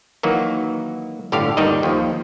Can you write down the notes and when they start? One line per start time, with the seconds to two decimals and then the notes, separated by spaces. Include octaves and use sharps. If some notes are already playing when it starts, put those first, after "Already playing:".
0.23 D#3 E3 F#3 A#3 F#4
1.32 G1 A2 D3 G4 F5
1.57 G1 D#2 D#3 G3 D#4 D#5
1.83 D#2 F3